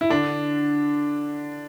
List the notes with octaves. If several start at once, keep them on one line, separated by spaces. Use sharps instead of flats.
E4
D3 D4